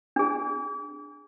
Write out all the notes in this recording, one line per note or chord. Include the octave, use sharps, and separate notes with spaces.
D4 G#4